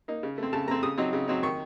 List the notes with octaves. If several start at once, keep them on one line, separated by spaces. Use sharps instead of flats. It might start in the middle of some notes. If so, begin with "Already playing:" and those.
A#3 D#4
C#3
A3 C4
C#3 A5
A3 C4 A#5
C#3 D#6
F#3 C4 D#4
C#3
F#3 C4 D#4
D#3 C#6